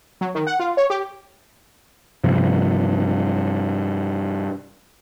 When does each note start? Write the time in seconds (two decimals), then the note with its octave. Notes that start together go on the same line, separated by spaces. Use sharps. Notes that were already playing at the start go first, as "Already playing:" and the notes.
0.21 F#3
0.35 D#3
0.47 F#5
0.60 F4
0.77 C#5
0.90 G4
2.24 G2 C3 F3